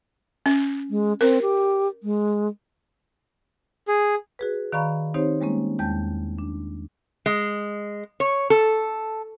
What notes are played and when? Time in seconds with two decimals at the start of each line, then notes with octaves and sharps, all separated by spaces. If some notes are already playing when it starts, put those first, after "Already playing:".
0.46 C#4
0.90 G#3
1.21 C4 A#4
1.42 G4
2.03 G#3
3.88 G#4
4.39 F#4 G#4 B4
4.72 D#3 D5 F5 A#5 B5 C#6
5.14 C4 D#4 G4 C5 C#5
5.41 G3 G#3 A#3 C#4
5.79 E2 G#3 G5 A5 G6
6.39 D4
7.26 G#3
8.20 C#5
8.50 A4